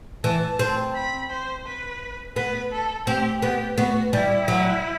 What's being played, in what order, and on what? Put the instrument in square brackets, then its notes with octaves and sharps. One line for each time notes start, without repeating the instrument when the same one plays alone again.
[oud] E3 [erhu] A5
[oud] C4
[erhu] B5
C5
B4
[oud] B3 [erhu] B4
[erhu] A4
[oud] C4 [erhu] G4
[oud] B3 [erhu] G4
[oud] B3 [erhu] F#4
[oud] G3 [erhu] E4
[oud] F#3